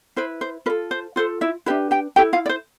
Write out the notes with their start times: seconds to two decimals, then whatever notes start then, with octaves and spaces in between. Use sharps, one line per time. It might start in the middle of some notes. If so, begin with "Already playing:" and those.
0.16 E4 B4 C5
0.41 C5
0.66 F4 B4
0.70 A4
0.91 C5
1.16 F4 A4 C5
1.41 E4 E5
1.66 D4 E4 G4 B4 E5
1.91 G4 G5
2.16 E4 G4 A4 G5
2.33 F4 F5
2.46 D5
2.49 C5